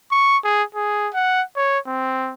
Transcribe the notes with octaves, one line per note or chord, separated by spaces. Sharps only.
C#6
G#4
G#4
F#5
C#5
C4